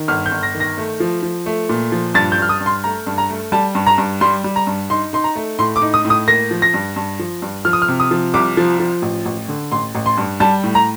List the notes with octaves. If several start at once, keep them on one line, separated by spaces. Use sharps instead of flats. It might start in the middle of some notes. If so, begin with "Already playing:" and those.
Already playing: D#3
G1 F6
G6
G1
A#6
D#3
A#6
A3
F3
F3
A3
A#2
F3
G2 A6
G6
G2 F6
D#6
G2
C6
A3 A#5
G2
A#5
A3
G3 A5
G2
A#5
G2
G3 C6
G3
A#5
G2
D#4 C6
D#4 C6
A#5
A3
A2 C6
D6
D#4
D#6
A2
D#6
A#3 A#6
F3
A#6
G2
G2
F3
G2
F3 F6
D#6
F6
C3
D#6
F3
C2 D6
F3
F3
A1
A1
D3
A1 C6
A1
C6
G2
G3 A5
A2
A#5